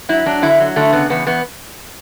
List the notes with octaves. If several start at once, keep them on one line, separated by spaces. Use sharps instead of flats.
F#3 E4
F#3 D4
D3 E4
F#3
D3 A3
C#3 B3
E2 B3
E2 B3